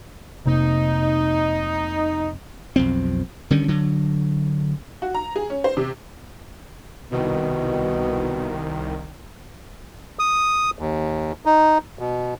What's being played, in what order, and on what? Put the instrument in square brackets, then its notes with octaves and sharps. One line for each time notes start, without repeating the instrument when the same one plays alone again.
[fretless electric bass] F1 C3 A#3 [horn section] D#4
[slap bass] B1 F2 C4
D3 D#3 G3 C#4
D3 F#3
[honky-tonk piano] F#4
A#5
G#4
C#4
C5
C3
[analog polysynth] C2 D#3 [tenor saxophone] B2
[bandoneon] D#6
D#2
D#4
B2